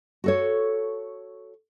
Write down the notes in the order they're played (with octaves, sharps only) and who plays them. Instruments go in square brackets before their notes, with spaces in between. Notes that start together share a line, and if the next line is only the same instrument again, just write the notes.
[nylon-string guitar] F#4 A4 C#5